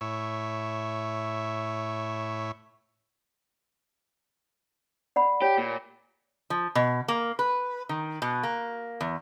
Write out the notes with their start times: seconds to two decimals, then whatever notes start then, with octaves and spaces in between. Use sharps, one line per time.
0.01 A2 C#5 E5
5.16 D5 F#5 B5
5.42 G4 C#5
5.58 A#2
6.50 F3
6.75 B2
7.08 A#3
7.39 B4
7.89 D#3
8.22 B2
8.43 A#3
9.01 E2